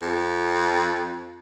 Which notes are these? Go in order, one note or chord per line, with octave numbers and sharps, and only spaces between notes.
F2